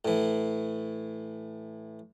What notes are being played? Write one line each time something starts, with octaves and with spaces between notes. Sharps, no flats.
A2 E3